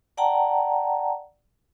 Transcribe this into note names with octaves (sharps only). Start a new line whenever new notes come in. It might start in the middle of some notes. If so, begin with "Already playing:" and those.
D5 F#5 G5 A5 A#5